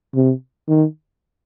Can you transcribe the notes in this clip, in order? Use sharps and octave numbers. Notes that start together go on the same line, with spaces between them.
C3
D#3